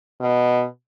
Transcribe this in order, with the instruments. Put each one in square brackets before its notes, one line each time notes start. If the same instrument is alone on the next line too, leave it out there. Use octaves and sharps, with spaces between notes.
[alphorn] B2